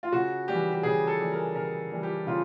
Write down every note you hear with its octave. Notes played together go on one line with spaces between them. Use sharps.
F4
C#3 F#4
E3 G3 G4
G4
C#3 G#4
A4
E3 G3
A#4
C#3 A#4
E3 G3
G4
C#3 F4